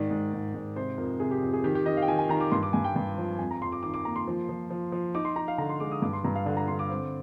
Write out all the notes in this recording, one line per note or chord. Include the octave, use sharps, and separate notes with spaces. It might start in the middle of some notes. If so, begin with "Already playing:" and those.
Already playing: G#2 D#3 D5
G#2
G#2
G#2
C3 C5
F2 A#4
C3 G#4
G4
F2
G#4
D#3 G4
G4
D#3 D#5
F5
G5
D#3 G#5
G#5
D#3 A#5
D6
G2 C6
D6
G2 G#5
G5
G2
F3
F2 G#5
A#5
F2 C6
D6
D#3 D6
D6
A#3 A#5
C6
F3
F3
F3
F3
D#4 D6
C6
D#4 A#5
F5
D3 A#5
C6
G#3 D6
D#6
G2 D6
C6
G2 A#5
F5
D3 D5
A#5
D3 C6
D6
C4